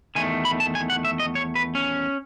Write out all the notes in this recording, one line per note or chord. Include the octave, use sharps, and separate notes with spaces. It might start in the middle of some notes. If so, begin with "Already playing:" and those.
E2 D#3 A3 G#5
B5
A5
G#5
F#5
E5
D#5
C#5
B4
C#4